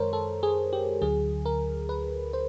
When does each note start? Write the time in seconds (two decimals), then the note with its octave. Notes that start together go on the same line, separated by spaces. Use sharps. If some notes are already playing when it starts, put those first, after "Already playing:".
Already playing: F#2 D#3 G#3 A#4 C5 C#5
0.13 A4
0.43 G#4
0.73 G4
1.01 D2 D3 F#3 G#4
1.46 A#4
1.89 B4
2.33 C5